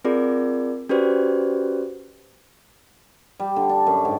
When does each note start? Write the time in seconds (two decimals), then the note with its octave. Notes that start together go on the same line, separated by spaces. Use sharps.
0.04 C4 F4 G#4 A#4 D5
0.89 C#4 F#4 G4 B4 C5 D5
3.40 G3
3.56 D3
3.69 D4
3.87 F#2
4.05 G#2